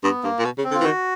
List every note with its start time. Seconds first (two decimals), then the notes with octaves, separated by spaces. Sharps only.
0.03 G2 B3
0.23 G2 A#3
0.39 A#2
0.44 B2
0.58 C#3
0.64 C4
0.71 D3
0.74 F4
0.80 E3
0.83 D#3 F#4